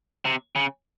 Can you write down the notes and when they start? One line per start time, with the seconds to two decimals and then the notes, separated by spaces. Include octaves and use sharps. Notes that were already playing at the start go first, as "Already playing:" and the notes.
0.25 C3
0.56 C#3